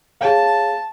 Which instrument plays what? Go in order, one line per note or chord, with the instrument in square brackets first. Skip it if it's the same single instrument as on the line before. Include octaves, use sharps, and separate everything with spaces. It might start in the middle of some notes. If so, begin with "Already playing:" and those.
[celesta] G#4 C#5 F5 [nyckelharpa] A5